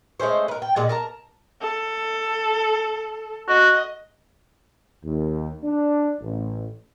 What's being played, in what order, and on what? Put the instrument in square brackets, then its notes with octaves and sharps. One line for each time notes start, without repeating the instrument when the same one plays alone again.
[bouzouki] G#3 A3 C#4 C5
A#4 B4
G5
A#2 G#3 D5
A#4 A5 A#5
[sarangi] A4
[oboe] F#4 [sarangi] D#5
[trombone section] D#2
D4
A1